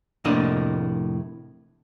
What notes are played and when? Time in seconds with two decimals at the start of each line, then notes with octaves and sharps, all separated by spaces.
0.25 F2 A2 C3 A#3 D4 D#5